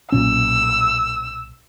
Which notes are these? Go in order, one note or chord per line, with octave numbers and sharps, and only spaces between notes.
B1 A#2 C#4 E6